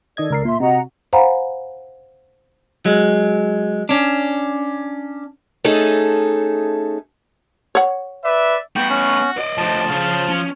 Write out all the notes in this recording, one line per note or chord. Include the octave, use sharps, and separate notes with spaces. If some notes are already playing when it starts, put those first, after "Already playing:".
D#3 A4 D5 D#5 G#6
C#2 A#4 C7
A#2 E5 C6
C3 F#4 D#5 F#5 A#5
C5 F5 F#5 G#5 A#5 B5
F#3 G#3
C#4 D4
A3 C#4 D#4 G#4 A4
C#5 F#5
B4 D5 E5
A3 B3 F#4 G5
C#4
D5 D#5
D2 F3 A5
C#3 F3 F5
C#4